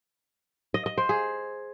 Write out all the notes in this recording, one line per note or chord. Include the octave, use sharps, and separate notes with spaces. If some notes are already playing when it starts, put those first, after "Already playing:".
D#5
D#5
C5
G#4